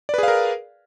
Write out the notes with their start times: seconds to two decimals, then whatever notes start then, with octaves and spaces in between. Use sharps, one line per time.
0.09 D5
0.14 B4
0.18 G#4
0.23 F5
0.28 A#4